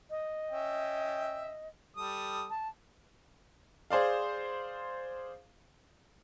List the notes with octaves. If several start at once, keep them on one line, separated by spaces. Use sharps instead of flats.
D#5
C#4 E5 G5
G3 A4 D#6
A5
G#4 C5 D5 F5